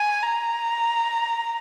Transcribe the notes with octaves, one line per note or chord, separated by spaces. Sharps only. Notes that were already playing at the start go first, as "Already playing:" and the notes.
Already playing: G#5
A#5